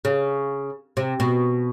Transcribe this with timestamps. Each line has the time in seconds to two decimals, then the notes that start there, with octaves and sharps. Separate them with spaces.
0.05 C#3
0.97 C3
1.20 B2